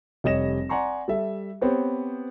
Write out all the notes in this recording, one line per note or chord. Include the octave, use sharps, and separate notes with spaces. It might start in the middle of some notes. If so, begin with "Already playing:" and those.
F1 G3 C#5 D#5 A#6 E7
D5 F#5 G#5 A#5 C6 C#6
G3 A4 E5
B3 C4 G4 C5 C#5